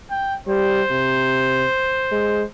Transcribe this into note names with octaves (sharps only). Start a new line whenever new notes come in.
G5
G3 C5
C3
G#3